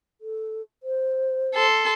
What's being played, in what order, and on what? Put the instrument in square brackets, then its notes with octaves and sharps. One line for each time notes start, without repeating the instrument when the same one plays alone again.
[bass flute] A4
C5
[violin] A4 C6